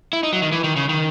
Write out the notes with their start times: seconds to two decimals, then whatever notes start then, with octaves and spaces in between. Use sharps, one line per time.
0.13 E4
0.23 D#4
0.33 F#3
0.42 D#3
0.52 E3
0.64 D#3
0.76 C#3
0.89 D#3